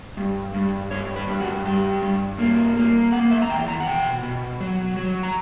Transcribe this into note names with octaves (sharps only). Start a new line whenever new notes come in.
G2
G2
G2 C#5
B4
G2
F#4
G2 G4
G2
A#3
A#3
A#3 F#5
E5
A#5
E2 G5
A#5
F#5
B2 G5
B2
F#3
F#3
A#5